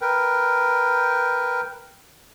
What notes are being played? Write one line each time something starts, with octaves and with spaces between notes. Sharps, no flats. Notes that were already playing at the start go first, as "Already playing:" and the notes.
A#4 B4 G5